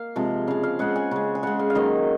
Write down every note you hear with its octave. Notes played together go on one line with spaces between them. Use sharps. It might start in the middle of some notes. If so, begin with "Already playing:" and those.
Already playing: A#3 F5
C3 F3 G#3
C#3 G#3 F5
F5
C#3 G#3 F#5
G#5
C#3 G#3
G#5
C#3 G#3 F#5
F5
F5
D#3 F#3 A#3 D#5